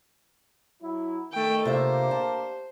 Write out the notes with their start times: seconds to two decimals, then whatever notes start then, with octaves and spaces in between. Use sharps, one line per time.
0.82 F#3 E4
1.32 D#3 A3 G5
1.65 C3 A#3 D4 F4 G4 C5 E5
2.11 A5